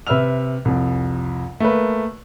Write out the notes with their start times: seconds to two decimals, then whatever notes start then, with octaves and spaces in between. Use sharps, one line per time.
0.07 C3 B4 E5 E6 F6 F7
0.65 C2 F2
1.60 A3 A#3 B4